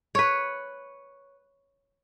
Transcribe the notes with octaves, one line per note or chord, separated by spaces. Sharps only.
B4 C#5